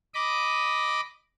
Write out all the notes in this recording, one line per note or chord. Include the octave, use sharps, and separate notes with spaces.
D#5 B5 D6